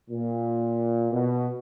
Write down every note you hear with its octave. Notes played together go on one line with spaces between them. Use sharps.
A#2
B2